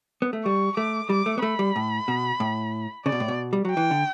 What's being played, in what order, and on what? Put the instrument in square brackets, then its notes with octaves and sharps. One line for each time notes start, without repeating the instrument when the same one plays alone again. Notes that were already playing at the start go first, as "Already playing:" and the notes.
[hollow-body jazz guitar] B3
A3
[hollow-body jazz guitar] G3 [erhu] C#6
[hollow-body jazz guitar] A3 [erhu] D6
[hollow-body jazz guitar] G3 [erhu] D6
[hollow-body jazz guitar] A3
B3
[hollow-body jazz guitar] A3 [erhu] B5
[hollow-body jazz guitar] G3
A2
B2
A2
[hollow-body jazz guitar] C#3 [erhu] D5
[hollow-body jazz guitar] B2
A2
B2
G3
F#3
[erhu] G5
[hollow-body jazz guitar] E3
D3